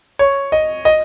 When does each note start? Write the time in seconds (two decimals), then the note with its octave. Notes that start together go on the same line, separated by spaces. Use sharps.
0.19 C#5
0.52 D#5
0.85 D#5